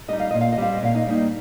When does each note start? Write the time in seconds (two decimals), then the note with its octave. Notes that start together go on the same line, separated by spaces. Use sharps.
0.08 G3 D#4 D#5
0.20 F5
0.31 A#2 D#5
0.41 F5
0.52 D#5
0.58 G3 C4 F5
0.74 D#5
0.82 A#2 F5
0.95 D#4 D#5
1.07 G3 A#3 D#4